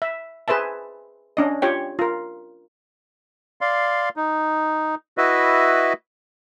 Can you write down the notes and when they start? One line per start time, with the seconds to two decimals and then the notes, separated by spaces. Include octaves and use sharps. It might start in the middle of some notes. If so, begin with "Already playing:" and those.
0.02 E5
0.48 G#4 B4 C5 E5 A5
1.37 C#4 D4 D#5
1.62 F4 G4 C#5 G5
1.99 F4 A#4
3.61 D5 F5 C6
4.16 D#4
5.18 E4 F#4 B4 D#5 E5